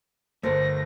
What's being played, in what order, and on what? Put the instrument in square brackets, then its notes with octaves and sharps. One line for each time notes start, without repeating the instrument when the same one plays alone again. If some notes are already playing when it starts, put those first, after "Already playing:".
[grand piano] G1 [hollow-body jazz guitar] A3 A4 A#4 [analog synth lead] C5 [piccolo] A#6